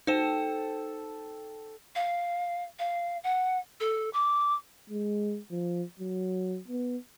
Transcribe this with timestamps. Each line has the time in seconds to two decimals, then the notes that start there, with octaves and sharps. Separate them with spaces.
0.07 D#4 A4 C5 G5 E7
1.96 F5
2.79 F5
3.24 F#5
3.80 A4
4.13 D6
4.90 G#3
5.51 F3
5.99 F#3
6.68 B3